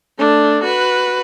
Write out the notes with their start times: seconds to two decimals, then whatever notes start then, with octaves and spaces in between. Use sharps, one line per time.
0.18 A3 D4
0.63 F#4 B4